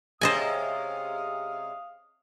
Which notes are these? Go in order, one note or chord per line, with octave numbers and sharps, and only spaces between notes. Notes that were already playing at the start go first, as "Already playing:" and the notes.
C3 G#3 C#4 C5 D#5 F5 G#5 D#6